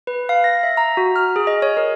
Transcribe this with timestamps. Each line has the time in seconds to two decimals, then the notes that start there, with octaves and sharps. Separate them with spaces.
0.07 B4
0.29 F5
0.44 A#6
0.63 E5
0.77 A#5
0.97 F#4
1.16 F6
1.36 G#4
1.47 D#5
1.62 C#5
1.77 A#4